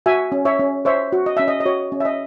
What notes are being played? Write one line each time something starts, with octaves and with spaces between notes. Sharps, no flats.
F#4 E5 G#5
C#4
C#5 E5
C#4
C5 C#5 E5
F#4
D#5
C#4 E5
D#5
D#5
F#4 C#5
C#4
E5
D#5